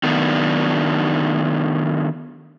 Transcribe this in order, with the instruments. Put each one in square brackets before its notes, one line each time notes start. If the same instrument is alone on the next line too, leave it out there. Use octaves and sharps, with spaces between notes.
[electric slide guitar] D#3 F#3 A3 B3 D4 D#4